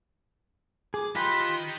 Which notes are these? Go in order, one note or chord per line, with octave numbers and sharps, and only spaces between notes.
G#4 D6
D#4 F4 G4 B4 G5 B5 C6